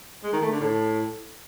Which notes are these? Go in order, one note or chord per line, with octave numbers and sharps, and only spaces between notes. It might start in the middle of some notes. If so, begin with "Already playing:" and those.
G#3
D#3
A3
D3
A2